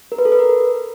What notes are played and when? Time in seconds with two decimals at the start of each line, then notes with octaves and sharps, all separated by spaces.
0.12 A#4
0.18 B4
0.25 A4
0.32 B4
0.39 A#4